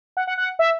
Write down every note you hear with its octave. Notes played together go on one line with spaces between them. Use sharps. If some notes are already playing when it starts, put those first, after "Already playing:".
F#5
F#5
F#5
E5